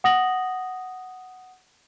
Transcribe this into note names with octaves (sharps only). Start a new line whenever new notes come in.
F#5 D#6 A#6 F#7